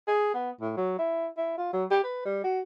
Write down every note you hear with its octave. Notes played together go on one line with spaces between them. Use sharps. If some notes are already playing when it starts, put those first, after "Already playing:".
G#4
B3
A2
F#3
E4
E4
F4
F#3
G4
B4
G3
F#4